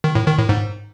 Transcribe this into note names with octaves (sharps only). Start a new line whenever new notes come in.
D#3
A2
D#3
A2
G#2